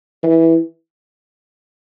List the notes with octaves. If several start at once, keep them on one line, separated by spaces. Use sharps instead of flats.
E3